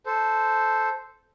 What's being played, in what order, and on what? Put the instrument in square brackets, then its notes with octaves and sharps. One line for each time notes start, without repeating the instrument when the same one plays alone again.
[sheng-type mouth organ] A4 C5